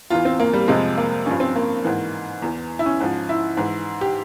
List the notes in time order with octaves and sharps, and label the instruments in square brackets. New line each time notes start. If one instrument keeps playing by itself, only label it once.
[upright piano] E2 E3 F4
C4
A#3
G3
F2 C3 F3 G#3
A#3
G2 F3 C#4
C4
A#3
G#2 E3
E2 E3
E4
C#4
G#2 F3
E4
G#2 E3
G4